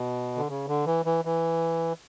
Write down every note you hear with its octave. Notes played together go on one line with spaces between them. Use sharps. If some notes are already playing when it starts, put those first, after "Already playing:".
Already playing: B2
D3
C#3
D3
E3
E3
E3